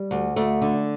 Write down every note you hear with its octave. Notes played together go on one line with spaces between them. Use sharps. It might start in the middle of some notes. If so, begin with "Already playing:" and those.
Already playing: G3
D2
D2 A3
D3